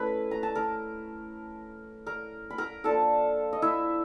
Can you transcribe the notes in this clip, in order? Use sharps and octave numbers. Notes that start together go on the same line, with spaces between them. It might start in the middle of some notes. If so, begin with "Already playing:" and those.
Already playing: A3 C#4 E4 B4 B5
A#5
A5
A#4 A#5
A#4 A#5
B5
A#4 A#5
F3 A#3 D4 A4 A5
D#5
E4 E5